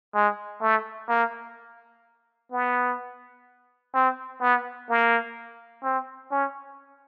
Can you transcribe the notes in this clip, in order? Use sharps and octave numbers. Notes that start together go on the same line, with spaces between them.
G#3
A3
A#3
B3
C4
B3
A#3
C4
C#4